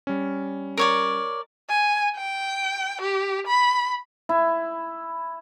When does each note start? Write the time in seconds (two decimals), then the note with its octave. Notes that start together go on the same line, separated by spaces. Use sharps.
0.07 G3 C#4
0.77 A#4 C#5 D5
1.69 G#5
2.16 G5
3.01 G4
3.47 B5
4.29 E4